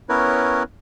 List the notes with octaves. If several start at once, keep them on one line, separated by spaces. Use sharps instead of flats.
B3 C#4 E4 A#4 B4 C#5